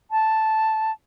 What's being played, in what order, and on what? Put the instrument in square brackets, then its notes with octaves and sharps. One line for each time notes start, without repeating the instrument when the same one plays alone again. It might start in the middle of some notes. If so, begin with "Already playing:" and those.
[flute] A5